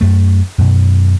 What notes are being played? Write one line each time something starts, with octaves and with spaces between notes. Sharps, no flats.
F#2 A3
F#2 B2